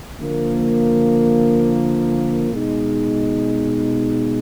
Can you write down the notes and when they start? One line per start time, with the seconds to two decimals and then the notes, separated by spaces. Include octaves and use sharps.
0.19 D3 F3 A#3
2.51 B2 G#3 D#4